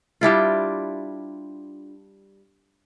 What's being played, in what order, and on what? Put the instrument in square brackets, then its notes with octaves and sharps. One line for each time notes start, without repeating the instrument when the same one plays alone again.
[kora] G3 D4 E4 F4